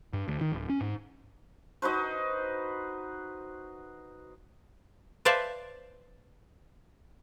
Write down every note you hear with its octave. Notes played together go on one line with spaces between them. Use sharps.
G2
D2
D#3
D1
C#4
G#2
D#4 F#4 B4 C5
B4 C5 D5 E5 F5 A5